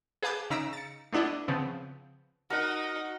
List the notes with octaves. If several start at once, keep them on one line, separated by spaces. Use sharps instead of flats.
G#4 B4 F5 A5 D6 G6
C#3 D#4 A#5 E6 B6 D7
A6 C#7
A3 B3 D4 E4 D#5
C#3 F3 B3 C4
D#4 F#4 A#4 F#5